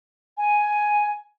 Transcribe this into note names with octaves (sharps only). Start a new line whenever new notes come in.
G#5